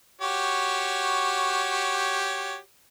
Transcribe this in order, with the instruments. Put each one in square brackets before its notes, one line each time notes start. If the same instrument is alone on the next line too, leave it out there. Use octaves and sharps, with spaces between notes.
[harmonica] F#4 G4 C#5